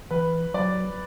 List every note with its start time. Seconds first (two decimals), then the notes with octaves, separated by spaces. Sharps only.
0.11 E3 B4
0.54 F#3 D5